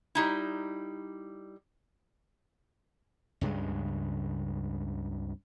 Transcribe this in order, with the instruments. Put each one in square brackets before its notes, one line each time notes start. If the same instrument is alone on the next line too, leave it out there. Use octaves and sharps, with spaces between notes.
[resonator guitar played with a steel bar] G3 D#4 E4
[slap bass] C#2 G2 C#3 G#3